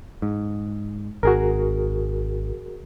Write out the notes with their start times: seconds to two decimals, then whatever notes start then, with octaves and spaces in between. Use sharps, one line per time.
0.22 G#2
1.23 G#1 F#4 G#4 A#4